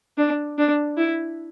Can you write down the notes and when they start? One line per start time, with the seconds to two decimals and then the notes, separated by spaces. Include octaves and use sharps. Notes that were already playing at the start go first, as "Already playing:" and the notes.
0.18 D4
0.58 D4
0.97 E4